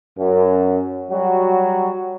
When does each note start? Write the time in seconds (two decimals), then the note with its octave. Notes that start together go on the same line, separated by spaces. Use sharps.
0.18 F#2
1.11 F#3 G3 F#4